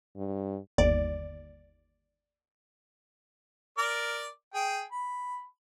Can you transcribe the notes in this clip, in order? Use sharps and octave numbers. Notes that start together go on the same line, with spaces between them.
G2
G1 D#2 D5
A#4 D5
G#4 G5
B5